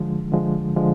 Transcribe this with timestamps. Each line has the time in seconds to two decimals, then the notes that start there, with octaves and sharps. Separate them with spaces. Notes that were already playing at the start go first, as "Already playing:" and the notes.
Already playing: D3 F3 G#3
0.32 D3 F3 G#3
0.76 D3 F3 G#3